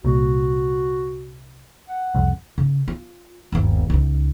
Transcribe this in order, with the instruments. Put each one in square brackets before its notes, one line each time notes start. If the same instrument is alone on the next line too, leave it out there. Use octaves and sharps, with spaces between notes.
[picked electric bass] C2 A#2 [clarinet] F#4
[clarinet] F#5
[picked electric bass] C2 F2
[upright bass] C#3
F4
G1 D#2
C#2 D#4